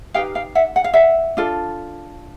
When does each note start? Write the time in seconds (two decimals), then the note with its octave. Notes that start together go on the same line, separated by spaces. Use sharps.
0.14 D#4 G4 B4 F5 G5
0.35 F5 G5
0.55 E5 F#5
0.76 F#5
0.84 F5
0.94 E5 F#5
1.37 D4 F4 A4